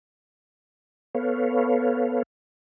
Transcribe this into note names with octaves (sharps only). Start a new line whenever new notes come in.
B3 A4 B4 C#5 F5